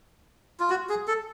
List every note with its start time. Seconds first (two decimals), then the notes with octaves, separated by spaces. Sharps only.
0.60 F4
0.70 F#4
0.89 G#4
1.08 A4